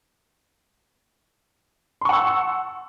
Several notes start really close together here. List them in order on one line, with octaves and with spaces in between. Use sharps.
C6 C#6 F#5 E6 A5